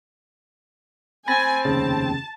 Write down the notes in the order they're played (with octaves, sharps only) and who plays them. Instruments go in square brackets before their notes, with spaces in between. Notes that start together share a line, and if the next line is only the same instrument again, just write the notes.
[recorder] C4 [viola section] G#5 [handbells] B5 A6 A#6
[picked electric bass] F1 D#2 C#3 [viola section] A5